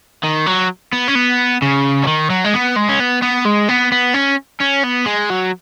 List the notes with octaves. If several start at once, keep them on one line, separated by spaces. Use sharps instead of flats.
D#3
F#3
B3
C#4
B3
C#3
F#3
D#3
F#3
G#3
B3
G#3
C#4
B3
B3
G#3
B3
B3
C#4
C#4
B3
G#3
F#3